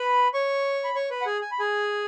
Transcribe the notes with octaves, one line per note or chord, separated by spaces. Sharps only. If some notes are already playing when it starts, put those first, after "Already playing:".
Already playing: B4 B5
C#5 C#6
B5
C#5 C#6
B4 B5
F#5
G#4 G#5
G#5
B5
G#4 G#5